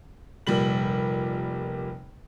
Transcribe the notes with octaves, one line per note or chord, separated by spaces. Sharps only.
F1 A#2 G3 F#7